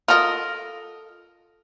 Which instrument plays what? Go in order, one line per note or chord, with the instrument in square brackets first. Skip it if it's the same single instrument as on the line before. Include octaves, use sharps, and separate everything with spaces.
[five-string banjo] F4 A4 A#4 D#5